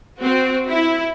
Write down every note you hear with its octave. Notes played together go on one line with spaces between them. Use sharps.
C4 F#4
E4